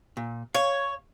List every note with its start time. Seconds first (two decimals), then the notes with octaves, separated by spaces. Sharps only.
0.17 A#2
0.54 C#5 F5